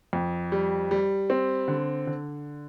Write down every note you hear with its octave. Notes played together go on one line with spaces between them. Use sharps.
F2
G3
G3
C4
D3
D3